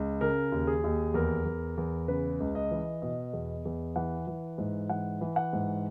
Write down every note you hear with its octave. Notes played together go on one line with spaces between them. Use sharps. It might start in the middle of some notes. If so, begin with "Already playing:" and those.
Already playing: C#2
C#3 A#4
D#2
G#4
D#2
E2 A#4
E2
E2
C#3 B4
C#2
D#5
E3
B2 D#5
E2
E2
E3 F#5
E3
G#2
E3 F#5
E3
F#5
G#2